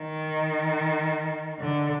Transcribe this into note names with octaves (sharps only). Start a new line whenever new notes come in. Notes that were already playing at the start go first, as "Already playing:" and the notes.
Already playing: D#3
D3